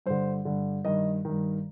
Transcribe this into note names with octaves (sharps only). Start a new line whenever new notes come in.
G2 D3 C5
G2 D3
G2 D#3 D#5
G2 D#3